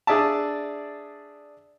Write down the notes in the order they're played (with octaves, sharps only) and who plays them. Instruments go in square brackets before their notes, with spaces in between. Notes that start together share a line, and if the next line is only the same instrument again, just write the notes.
[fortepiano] D4 G#4 D5 E5 A5